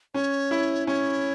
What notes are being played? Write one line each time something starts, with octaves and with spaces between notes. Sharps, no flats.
C#4 C#5
E4
C#4 C#5